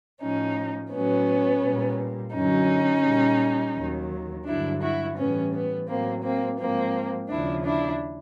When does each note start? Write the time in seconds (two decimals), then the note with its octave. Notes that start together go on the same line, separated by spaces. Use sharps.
0.21 A2 F3 C#4 D#4
0.92 A2 F#3 B3 C#4
1.63 A#2 G3
2.34 F#2 D3 F#3 C#4 D#4
3.05 A#2 G3
3.75 D#2 D#3 F#3
4.46 G2 D3 F#3 D4 E4
4.81 E4 F#4
5.17 A2 E3 G3 B3 C#4
5.53 B3
5.88 A2 F#3 A#3 C4
6.23 A#3 C4
6.59 G#2 F3 A#3 C4
7.29 D#2 C#3 F3 D4 E4
7.65 D4 E4